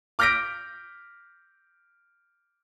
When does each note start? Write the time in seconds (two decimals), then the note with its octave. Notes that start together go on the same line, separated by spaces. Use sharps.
0.19 D6 F6 G6 A#6 B6 D7